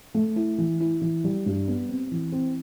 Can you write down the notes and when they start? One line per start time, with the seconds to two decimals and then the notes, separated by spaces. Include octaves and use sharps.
0.14 A3
0.36 E4
0.58 E3
0.80 E4
1.01 E3
1.24 G3
1.46 G2
1.68 B3
1.89 C4
2.11 E3
2.32 C4